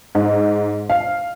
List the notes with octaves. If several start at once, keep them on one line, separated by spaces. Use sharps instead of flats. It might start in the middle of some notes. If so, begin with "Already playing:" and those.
G#2
F5